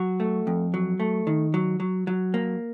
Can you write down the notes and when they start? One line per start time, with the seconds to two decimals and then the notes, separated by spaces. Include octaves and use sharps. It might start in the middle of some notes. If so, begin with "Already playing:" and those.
Already playing: F#3 F#4
0.20 A3
0.47 F2
0.74 F#3
1.00 A3
1.27 D#3
1.54 F#3
1.80 F#3
2.07 F#3
2.34 A#3